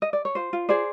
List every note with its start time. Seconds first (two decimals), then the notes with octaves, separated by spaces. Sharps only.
0.02 D#5
0.13 D5
0.25 C#5
0.35 F4 C5
0.53 F4
0.69 G#4 C5 D5